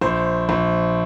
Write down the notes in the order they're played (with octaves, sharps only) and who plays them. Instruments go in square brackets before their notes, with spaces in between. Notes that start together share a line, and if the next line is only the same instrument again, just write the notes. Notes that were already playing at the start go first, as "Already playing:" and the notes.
[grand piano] A#1 C5
A#1